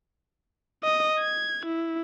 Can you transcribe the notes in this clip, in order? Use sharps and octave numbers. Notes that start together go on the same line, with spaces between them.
D#5
G#6
E4